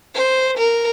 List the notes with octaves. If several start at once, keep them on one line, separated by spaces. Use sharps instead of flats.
C5
A#4